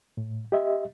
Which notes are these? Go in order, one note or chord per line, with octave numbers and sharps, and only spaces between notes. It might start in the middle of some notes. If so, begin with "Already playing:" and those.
A2
G4 D#5 E5